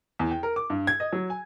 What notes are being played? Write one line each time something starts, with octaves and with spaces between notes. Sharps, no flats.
E2
G5
A#4
D6
G2
G#6
D#5
F#3
G#5